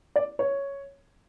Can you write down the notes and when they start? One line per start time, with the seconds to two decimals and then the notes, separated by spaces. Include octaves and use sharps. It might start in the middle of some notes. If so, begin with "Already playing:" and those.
0.16 D5
0.39 C#5